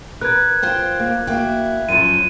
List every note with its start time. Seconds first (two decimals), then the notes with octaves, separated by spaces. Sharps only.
0.21 A#4 B4 F#6 G#6
0.62 F4 C5 G5
1.00 A#3
1.27 A#3 E4 F#4 G5
1.89 F#2 F3 D#7